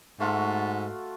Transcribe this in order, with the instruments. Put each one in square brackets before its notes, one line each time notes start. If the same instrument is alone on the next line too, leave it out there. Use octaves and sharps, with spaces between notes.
[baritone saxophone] G#2 [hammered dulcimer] A3 F4 F#4